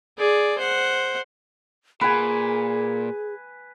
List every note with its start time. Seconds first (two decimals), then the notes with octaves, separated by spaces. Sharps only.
0.18 G#4 D5
0.58 C5 F#5
2.01 A#2 G#4 B4 G#5